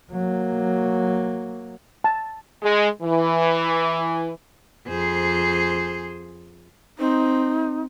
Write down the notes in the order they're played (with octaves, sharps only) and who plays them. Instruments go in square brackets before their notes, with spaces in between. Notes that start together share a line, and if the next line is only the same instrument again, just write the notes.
[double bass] F#3 A#3
[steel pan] A5
[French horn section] G#3
E3
[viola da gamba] F2 G#4 C5
[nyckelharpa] C4 [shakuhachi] D#4